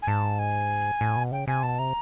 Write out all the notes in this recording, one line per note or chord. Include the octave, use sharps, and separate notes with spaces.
G#5
G#2 A5
G#5
A2
B2
C#3 G5
C3 G#5
B2 A5
C3 A#5